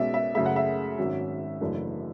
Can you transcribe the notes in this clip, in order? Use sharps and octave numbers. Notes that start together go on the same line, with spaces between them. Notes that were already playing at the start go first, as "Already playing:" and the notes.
Already playing: B1 B2 G#3 C#4 D5 E5
E5
F#2 C#3 F#3 A3 E5
F#5
E5
G#1 G#2 F#3 C#4
F#1 F#2 E3 A3 D4